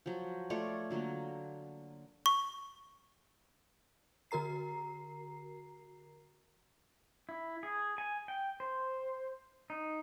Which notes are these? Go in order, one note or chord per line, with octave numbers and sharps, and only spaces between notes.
F3 F#3
A3 F4 C#5 D5
D3 F#3 A#3 F4
C#6
D3 F#4 A#4 A#5 C7
E4
G#4
G#5
G5
C5
D#4